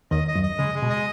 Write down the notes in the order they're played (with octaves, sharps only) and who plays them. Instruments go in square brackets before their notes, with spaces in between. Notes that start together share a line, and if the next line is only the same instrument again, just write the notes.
[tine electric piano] D#2 D#3 [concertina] D#5
[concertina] D#5
[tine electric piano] F#2 F#3
[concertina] D#5
[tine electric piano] C#3 [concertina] G#3
[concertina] G#3
[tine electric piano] B2
[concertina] D#5